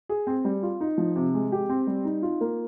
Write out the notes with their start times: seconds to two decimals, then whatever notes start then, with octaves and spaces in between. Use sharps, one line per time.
0.09 G#4
0.27 C4
0.45 G3
0.63 F4
0.81 D#4
0.98 F3
1.16 C3
1.34 G#3
1.52 G4
1.69 C4
1.87 G3
2.05 D#4
2.22 F4
2.41 A#3